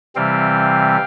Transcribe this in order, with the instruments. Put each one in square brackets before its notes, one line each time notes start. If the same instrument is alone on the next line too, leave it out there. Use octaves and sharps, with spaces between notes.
[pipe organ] C3 E3 G3 C4 F5 G5